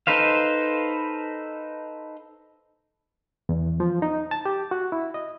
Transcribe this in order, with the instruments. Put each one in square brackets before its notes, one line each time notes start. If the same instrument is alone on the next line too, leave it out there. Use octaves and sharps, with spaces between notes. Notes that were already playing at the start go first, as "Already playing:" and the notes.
[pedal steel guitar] D#4 A4 B4 C5 F5
[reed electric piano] E2
F3
D#4
A5
G4
F#4
E4
D#5